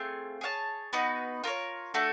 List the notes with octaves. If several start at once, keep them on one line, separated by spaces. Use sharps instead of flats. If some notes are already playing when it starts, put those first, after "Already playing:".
Already playing: A3 C4 F4 G#4
G#4 C#5 F#5 A5
B3 D#4 F#4 B4
F4 A#4 C#5
A3 D4 F#4 A4